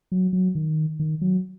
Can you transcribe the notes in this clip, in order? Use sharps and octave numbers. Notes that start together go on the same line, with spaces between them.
F#3
F#3
D#3
D#3
F#3